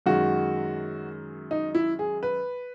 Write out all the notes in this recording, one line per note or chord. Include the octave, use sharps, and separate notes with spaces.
F#2 D#3 G#3 F#4
D#4
E4
G#4
B4